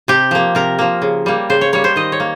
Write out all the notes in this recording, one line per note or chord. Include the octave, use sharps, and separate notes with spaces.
C3 G4
F3 A#3
C3 A#4
F3 A#3
C#3
G3 A#3
C#3 C5
C#5
G3 A#3 C#5
C5
D#3 D#5
C#5
A#3